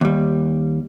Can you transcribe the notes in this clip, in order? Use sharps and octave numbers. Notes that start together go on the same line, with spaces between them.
D#2 G3